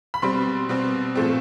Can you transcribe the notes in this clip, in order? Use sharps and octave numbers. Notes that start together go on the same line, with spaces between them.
B5
B2 G3 C4 C6
B2 G3 C4
A#2 F3 A3 C4